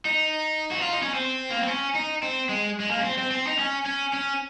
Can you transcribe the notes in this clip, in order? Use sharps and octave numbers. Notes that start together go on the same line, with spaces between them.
D#4
F#4
F4
D#4
C#4
C4
A#3
C4
C#4
D#4
C4
G#3
G#3
A#3
C#4
C4
C4
C4
D#4
C#4
C#4
C#4